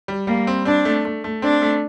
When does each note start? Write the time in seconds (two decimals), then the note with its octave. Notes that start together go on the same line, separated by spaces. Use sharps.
0.08 G3
0.27 G3 A#3
0.47 C4
0.65 C4 D4
0.85 A3
1.05 A3
1.24 A3
1.42 C4 D4
1.62 A3